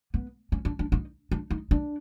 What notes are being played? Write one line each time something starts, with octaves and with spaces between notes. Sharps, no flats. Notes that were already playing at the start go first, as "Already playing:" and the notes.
B3
C#4
D4
D4
D#4
D4
D#4
D4